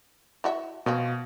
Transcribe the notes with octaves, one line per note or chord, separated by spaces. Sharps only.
E4 F#4 E5
B2 F3 A#3 C4